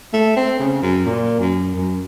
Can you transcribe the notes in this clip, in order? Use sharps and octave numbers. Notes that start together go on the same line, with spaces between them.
A3
C4
C#3
F#2
A#2
F#2
F#2